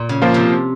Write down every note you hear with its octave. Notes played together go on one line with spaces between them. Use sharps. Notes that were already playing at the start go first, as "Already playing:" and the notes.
Already playing: A#2
C#3
F3 A#3 F4 C5
C3